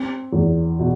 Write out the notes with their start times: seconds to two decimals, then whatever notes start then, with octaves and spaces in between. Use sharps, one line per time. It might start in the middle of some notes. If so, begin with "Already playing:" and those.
Already playing: C4
0.33 E2
0.79 B2